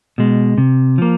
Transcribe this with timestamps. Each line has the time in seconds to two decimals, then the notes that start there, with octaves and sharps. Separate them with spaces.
0.18 B2 G#3
0.58 C3
0.98 F3 A#3